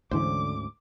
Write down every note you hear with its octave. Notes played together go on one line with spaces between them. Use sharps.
D2 G#2 D3 E3 G#3 C#4 C5 D6